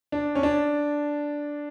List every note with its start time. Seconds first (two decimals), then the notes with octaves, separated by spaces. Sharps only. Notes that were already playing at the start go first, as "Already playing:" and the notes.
0.12 D4
0.35 C#4
0.43 D4